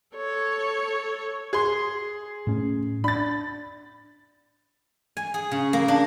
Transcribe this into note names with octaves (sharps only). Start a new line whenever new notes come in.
A4 C#5
G#4 C6
A2 C#4
D4 B5 A6
G#5
G#4
C#3
A#3
D4